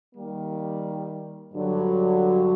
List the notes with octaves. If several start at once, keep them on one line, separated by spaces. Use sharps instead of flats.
D#3 G3 A#3
G2 D3 F#3